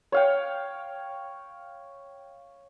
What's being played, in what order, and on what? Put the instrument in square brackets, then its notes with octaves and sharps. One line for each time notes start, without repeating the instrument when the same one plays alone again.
[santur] C#5 F5 G5